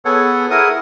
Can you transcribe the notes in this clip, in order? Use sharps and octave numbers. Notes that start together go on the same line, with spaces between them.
B3 G#4 A4 C#5 F#5
E4 G#4 A#4 F#5 D#6